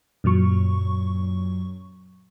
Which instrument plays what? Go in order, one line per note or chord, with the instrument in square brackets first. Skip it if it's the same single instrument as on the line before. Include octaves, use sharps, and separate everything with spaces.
[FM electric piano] F#2 A#2 F#3 C#6